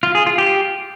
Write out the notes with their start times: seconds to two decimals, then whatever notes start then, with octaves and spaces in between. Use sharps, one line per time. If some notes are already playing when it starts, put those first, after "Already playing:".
0.03 F4
0.15 G#4
0.26 F4
0.38 G4